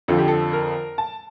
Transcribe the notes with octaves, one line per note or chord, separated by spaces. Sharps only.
F2 D3 F3 A4
G4
A4
A#4
A5